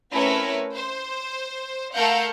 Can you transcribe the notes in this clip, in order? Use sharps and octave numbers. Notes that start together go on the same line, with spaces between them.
A3 C4 C#4 E4 A#4 B4
C5
A3 A4 A#4 F5 F#5 G6